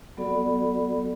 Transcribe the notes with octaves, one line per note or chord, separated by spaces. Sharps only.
F#3 B3 F#4 A4 D5 B5